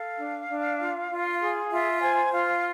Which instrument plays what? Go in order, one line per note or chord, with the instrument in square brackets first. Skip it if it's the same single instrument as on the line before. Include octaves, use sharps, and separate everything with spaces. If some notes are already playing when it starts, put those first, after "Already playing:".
Already playing: [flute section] A4 F5
D4
D4
F4
F4
G#4
F4 E5
C5 G#5
F4 F5